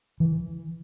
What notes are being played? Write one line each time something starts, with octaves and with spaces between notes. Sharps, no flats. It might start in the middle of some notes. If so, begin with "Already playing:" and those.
E3